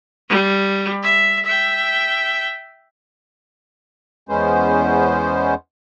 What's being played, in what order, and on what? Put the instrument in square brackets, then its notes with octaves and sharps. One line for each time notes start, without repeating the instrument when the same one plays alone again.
[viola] G3
E5
E5 G5
[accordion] E2 G#3 B3 C#4 C5